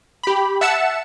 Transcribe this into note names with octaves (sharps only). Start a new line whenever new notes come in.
G4 B5
E5 F#5 A5 E6 C#7 E7